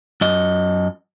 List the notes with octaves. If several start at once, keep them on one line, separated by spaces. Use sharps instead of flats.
F#2 D#5